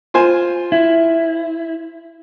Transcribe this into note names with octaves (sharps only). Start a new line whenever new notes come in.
F4 C5 G#5
E4